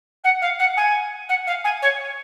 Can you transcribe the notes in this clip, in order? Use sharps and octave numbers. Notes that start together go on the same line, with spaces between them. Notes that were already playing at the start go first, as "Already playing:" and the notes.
F#5
F5
F#5
G#5
F#5
F5
G#5
C#5